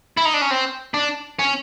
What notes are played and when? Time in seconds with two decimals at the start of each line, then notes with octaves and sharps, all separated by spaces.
0.17 E4
0.25 D#4
0.34 D4
0.41 C#4
0.51 C4
0.94 D4
1.39 C#4